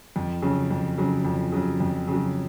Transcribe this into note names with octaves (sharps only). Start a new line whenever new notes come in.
F2
C#3 F#3
F2
C#3 F#3
F2
C#3 F#3
F2
C#3 F#3